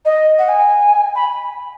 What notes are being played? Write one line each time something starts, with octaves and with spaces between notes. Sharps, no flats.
D#5
F#5
G#5
B5